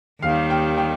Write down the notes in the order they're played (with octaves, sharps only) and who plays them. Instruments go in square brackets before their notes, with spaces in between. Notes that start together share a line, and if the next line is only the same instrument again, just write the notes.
[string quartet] D#2 D#3 G3 [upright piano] F5
[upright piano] G5
G5